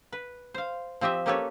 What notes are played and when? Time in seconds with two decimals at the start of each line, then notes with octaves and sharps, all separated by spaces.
0.12 B4
0.54 C5 F5
1.01 F3 C4 G4 D#5 E5
1.26 A#3 C#4 G4 A4 B4 C#5